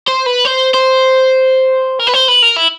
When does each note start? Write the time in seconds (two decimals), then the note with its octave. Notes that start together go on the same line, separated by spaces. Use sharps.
0.08 C5
0.27 B4
0.46 C5
0.74 C5
1.99 A#4
2.07 B4
2.14 C5
2.28 B4
2.43 A#4
2.57 E4